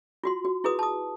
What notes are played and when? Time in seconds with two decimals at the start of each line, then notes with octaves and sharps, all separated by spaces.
0.24 F4 F#4 C6
0.45 F#4
0.64 E4 G#4 B4 D#6
0.79 A5 D#6